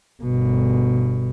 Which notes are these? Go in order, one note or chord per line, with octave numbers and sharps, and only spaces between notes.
G1 B2